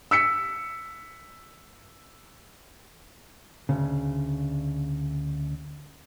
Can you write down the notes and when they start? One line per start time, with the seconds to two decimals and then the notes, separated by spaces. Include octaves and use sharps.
0.11 E6 B6 C#7
3.69 D2 C#3